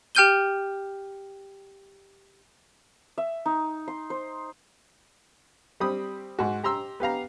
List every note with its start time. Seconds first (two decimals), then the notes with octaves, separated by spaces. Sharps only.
0.15 G4 G5 F6 G6 D#7 G7
3.18 E5
3.46 D#4
3.88 C6
4.10 C5
5.80 G3 C4 B5 D#6
6.39 G#2 F#4
6.63 G4 A#5 C6 E6
7.00 B3 G4 F5 A#5